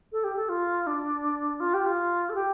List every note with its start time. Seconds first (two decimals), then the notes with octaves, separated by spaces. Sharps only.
0.12 A4
0.24 G4
0.36 A4
0.49 F4
0.87 D4
1.60 F4
1.74 G4
1.86 F4
2.29 A4
2.35 G4